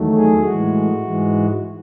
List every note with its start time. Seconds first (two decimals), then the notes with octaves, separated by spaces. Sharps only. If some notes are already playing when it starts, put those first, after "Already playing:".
Already playing: E2 D#3 F#3 A3
0.15 G#4
0.44 A2 E3 G#3 F#4
1.01 G#2 E3 G#3